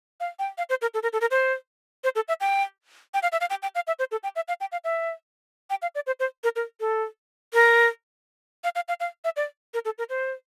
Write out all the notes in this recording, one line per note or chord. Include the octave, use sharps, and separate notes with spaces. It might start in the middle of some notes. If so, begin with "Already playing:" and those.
F5
G5
F5
C5
A#4
A4
A#4
A4
A#4
C5
C5
A4
E5
G5
G5
F5
E5
F5
G5
G5
F5
E5
C5
A4
G5
E5
F5
G5
F5
E5
G5
F5
D5
C5
C5
A#4
A#4
A4
A#4
F5
F5
F5
F5
E5
D5
A#4
A4
A#4
C5